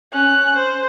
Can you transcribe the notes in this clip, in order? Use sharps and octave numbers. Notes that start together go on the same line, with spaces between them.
C#4 F#6
C5